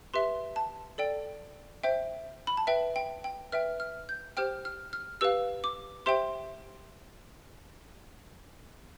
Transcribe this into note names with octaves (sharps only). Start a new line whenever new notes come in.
G4 B4 E5 C6
A5
A4 D5 G5
C5 E5 G5
B5
A5
B4 E5 G5
G5
G5
B4 E5 G5 F6
F6
G6
G4 C5 G5 F6
F6
F6
G4 B4 F5 E6
D6
G4 C5 E5 G5 C6